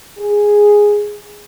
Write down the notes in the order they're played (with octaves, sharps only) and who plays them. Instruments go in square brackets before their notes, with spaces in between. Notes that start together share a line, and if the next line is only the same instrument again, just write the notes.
[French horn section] G#4